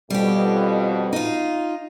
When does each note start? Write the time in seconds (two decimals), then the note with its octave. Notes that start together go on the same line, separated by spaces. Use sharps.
0.10 F2 B2 G3 G4
1.13 D#4 F4